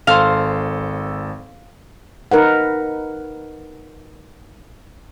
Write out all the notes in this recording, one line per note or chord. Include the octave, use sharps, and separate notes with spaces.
G#1 A4 C5 F5
D#4 A#4 B4 F#5